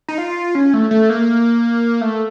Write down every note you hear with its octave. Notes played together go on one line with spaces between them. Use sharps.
D#4
F4
C#4
A3
A3
A#3
A3